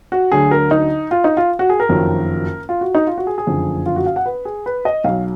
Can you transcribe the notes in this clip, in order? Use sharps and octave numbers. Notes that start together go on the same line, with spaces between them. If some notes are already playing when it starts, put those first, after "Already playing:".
F#4
D2 D3 F#3 G#4
A#4
D#4
F4
D#4
F4
F#4
G#4
A#4
F#1 F2 D#3 F#3
F4
F#4
D#4
F4
F#4
G#4
G#4
F#1 F2 D3
F4
F#4
F5
F#5
B4
G#4
B4
D#5
B1 B2 F#3 F5